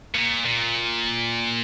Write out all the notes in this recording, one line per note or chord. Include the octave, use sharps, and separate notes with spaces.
A#2
A#2